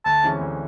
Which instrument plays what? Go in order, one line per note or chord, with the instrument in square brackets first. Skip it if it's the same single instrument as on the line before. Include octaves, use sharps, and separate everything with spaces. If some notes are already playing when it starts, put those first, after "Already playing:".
[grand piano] D2 [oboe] A5
[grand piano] C3 E3 G#3 C#4
D2